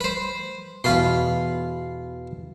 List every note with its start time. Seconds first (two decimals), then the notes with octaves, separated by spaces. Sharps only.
0.01 B4 C5
0.84 E2 B2 F4 B4 C6